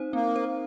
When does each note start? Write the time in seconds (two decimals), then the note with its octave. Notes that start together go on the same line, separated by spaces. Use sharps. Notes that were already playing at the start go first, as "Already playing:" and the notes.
Already playing: C4 D#4 C5
0.13 A#3 C4
0.36 C5